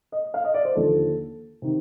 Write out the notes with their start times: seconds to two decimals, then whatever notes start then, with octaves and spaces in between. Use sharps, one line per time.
0.12 D#5
0.34 F5
0.45 D#5
0.54 D5
0.65 C5
0.75 D#2 D3 F3 A4
1.62 C3 D#3